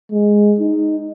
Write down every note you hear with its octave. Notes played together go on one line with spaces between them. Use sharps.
G#3
D#4